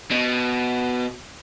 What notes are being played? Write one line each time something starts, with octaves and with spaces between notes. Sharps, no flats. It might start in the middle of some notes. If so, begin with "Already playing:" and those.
B2